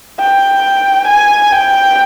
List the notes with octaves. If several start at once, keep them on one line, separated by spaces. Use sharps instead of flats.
G5
G#5
G5